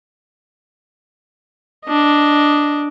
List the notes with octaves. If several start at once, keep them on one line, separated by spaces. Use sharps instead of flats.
D4 D#5